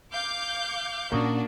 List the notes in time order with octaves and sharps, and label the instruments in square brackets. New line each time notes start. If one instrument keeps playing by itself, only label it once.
[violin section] F5 D6 G6
[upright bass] A#2 C#4 [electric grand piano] A#3 C#6 D#6 [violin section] D4 F#4